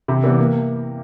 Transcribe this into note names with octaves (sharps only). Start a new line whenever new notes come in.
C3
E3 G3 B3
A#3